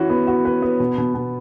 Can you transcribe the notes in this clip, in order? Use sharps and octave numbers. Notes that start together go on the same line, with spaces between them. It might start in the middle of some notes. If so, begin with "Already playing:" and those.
Already playing: E3 C#4 F#4
B3
F#4
B4
B3
B2
B2
B2